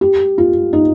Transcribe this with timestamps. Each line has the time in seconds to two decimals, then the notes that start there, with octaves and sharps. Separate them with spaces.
0.01 G4
0.38 F4
0.73 D#4